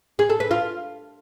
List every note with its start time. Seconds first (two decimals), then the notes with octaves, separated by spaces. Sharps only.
0.19 G#4
0.30 A4
0.40 B4
0.51 F4